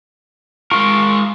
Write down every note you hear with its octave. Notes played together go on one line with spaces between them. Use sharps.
G#3 F4 A#4 C#6